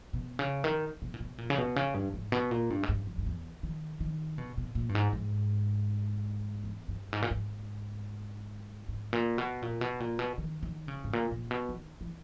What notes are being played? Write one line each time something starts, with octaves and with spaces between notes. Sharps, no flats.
B2
C#3
D#3
B2
A#2
B2
A#2
C#3
B2
C#3
G2
G#2
B2
A#2
G2
G#2
G2
G2
G2
E2
D#3
D#3
B2
B2
A#2
G2
G#2
G#2
E2
G2
G#2
A#2
G#2
G#2
A#2
B2
A#2
B2
A#2
B2
D#3
D#3
C#3
G#2
A#2
A#2
B2
D#3
E3